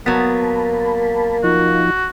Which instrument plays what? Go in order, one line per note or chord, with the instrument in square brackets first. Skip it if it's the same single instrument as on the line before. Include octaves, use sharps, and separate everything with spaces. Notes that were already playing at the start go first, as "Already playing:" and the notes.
[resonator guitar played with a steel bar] F#3 B3 [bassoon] A#3 [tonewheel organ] A5 B5
[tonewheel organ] F3 D#4 F4 [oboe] F#4